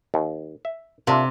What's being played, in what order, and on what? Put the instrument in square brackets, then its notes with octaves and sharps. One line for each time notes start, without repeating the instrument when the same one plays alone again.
[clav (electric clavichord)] D#2
E5
[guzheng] C3 [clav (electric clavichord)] A#3 D4 F4